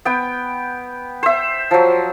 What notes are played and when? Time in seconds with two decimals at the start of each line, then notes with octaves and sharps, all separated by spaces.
0.05 B3 G5
1.23 C5 E5
1.71 F3 F#3